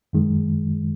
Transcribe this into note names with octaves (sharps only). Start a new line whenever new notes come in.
F#2 D#3 G#3